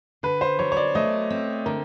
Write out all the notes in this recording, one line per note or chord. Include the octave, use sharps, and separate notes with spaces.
D3 B4
C5
F#3 C#5
C#5
D5
A3 D#5
C4
D3 A#4